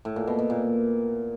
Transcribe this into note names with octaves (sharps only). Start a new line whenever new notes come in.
A2
A#2
B2
B2
A#2